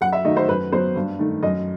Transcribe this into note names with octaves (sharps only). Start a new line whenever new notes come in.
F#2 F#5
E5
D#3 F#3 A3 D#5
C5
F#2 B4
F#3 B3 C5
G2
D#3 A3
F#2 D#5